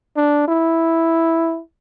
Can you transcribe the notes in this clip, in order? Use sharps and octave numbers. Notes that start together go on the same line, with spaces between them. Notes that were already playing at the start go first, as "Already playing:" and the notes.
D4
E4